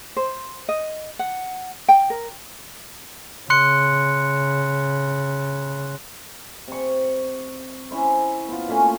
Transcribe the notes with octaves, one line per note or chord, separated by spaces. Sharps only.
C5
D#5
F#5
G5
A#4
C#3 C6 F#6 C#7
C3 C#6
C#4 E4 C5
B3 F4
A#2 A3 C#4 G#5